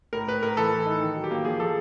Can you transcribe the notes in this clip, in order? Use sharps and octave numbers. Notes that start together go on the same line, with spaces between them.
A2 A#4
A2 B4
A2 A#4
E3 A4
E3
D#4
D#3
F#3
G4
A#3
F3 G#4
F3 A4